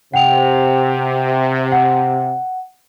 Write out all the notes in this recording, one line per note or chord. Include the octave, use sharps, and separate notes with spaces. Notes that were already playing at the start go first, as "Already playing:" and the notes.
C3 F#5 G5 F7
F#5